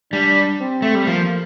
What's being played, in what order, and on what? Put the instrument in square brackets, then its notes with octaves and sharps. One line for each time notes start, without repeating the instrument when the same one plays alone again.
[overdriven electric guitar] G3 [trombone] D4
[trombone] C4
[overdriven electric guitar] A3
G3
[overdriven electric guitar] F3 [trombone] A#3